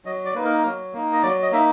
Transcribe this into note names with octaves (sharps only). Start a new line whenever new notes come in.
F#3 D#5
D5
A#3 D#4 B4
A#4
F#3
A#3 D#4
D#5
F#3 D5
D#5
A#3 D#4 E5